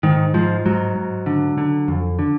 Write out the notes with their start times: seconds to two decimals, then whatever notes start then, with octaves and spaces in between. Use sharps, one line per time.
0.03 G#2 D#3
0.34 G#2 F3
0.66 G#2 F#3
0.96 G#2
1.26 D3
1.58 D3
1.88 F2
2.19 D3